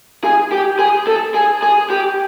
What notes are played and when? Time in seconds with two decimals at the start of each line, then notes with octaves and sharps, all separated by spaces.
0.24 G#4
0.52 G4
0.79 G#4
1.07 A4
1.34 G#4
1.62 G#4
1.90 G4